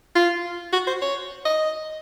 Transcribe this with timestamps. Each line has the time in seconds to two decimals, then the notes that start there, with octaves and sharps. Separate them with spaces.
0.15 F4
0.73 F#4
0.87 C5
1.01 C#5
1.45 D#5